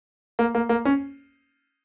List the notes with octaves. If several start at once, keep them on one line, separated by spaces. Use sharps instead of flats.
A#3
A#3
A#3
C#4